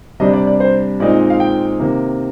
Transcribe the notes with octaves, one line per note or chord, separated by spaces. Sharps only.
C3 G3 D4 D#5
D5
D5
C5
A#2 G#3 C4 D#4 D5
D#5
D#5
F5
G5
C3 D#3 A#3